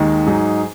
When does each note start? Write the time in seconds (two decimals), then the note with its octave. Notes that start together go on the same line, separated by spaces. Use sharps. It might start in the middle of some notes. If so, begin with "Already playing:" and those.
Already playing: D#2 D#3 G#3
0.26 G#2 F#3 D#4 G#4